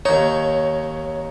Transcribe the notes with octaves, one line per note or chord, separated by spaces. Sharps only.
D#2 D#4 C#5